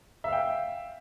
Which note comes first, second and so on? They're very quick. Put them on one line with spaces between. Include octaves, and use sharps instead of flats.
E5 F5 G5